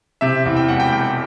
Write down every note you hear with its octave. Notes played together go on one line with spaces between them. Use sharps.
C3 E5
E2
G5
E1 F#5
G5
E1 G5